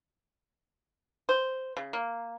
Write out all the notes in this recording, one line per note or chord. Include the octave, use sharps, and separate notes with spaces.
C5
C#3
A#3